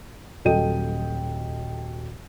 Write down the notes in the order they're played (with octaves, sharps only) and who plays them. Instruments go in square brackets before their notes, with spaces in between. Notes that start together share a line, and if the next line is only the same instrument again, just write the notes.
[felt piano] D#1 F#3 A4 D#5 G5 D#7